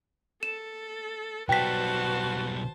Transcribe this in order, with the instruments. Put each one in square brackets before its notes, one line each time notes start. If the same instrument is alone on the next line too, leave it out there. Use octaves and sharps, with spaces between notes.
[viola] A4 [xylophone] E7
[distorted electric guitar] B1 G3 [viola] F#4 B4 [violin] C5 A5 [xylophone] G5 B6